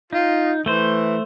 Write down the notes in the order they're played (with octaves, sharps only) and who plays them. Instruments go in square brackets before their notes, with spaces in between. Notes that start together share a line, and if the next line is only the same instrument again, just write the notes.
[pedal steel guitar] D#4 [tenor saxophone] F4
[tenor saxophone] E3 [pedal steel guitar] A3 C5